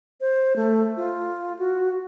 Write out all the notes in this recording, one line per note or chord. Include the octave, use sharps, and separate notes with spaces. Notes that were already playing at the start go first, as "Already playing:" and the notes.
C5
A3
F4
F#4